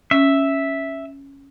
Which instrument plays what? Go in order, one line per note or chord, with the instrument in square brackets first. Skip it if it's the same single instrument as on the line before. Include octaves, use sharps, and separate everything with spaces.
[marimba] C#4 [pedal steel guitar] E5